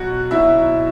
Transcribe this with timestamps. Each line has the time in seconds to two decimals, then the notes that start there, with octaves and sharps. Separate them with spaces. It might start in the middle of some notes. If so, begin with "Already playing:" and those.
Already playing: B2 F#3 F#4
0.31 B2 F#3 E4 E5